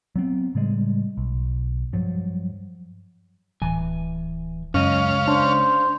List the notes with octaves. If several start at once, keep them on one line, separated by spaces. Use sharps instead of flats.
F#3 B3 C4
A2 C#3 G3 G#3
B1
G2 F3 F#3
D1 E3 G#5
C#2 F#2 C#4 D#5 F5
D4 C5